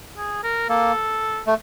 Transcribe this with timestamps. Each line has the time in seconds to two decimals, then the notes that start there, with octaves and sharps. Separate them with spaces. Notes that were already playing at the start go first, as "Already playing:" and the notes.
0.18 G#4
0.43 A#4
0.69 A#3 A4
1.47 A3